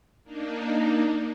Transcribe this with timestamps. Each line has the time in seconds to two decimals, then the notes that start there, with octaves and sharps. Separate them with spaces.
0.24 A#3 D4 D#4